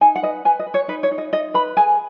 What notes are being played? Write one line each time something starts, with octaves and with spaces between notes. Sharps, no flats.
D#4 G#5
F#5
B4 D#5
B4 G#5
D#5
B4
C#5
D#4 B4
C#5
D#4
D#5
D#4 D#5
B4 B5
G#4 G#5